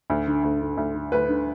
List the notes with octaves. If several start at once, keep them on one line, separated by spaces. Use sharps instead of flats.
D2
D3
D2
D3
D2
D3
D2 B4
D3